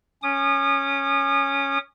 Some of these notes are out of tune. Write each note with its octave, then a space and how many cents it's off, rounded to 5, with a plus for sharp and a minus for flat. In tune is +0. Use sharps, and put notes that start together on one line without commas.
C#4 +0 D#6 -40